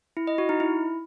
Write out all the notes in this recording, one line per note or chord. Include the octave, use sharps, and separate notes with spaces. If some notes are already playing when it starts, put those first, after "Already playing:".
E4
D#5
F#4
D#4
E4